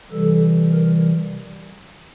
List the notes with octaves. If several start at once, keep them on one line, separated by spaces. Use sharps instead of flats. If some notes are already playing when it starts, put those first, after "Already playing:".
C3 E3 G3 A4
A#4